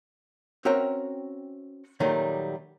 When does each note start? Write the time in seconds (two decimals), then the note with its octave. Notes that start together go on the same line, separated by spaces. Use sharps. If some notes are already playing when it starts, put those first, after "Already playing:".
0.65 C4 C#4 F#4 A#4 E5 G5
2.00 A#2 D#3 F#3 G3 A3